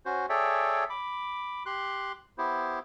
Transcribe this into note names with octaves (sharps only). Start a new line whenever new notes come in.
C#4 F#4 C5
G#4 A4 C#5 D5 E5 G5
B5 D6
G4 C6 F#6
B3 E4 G4 C5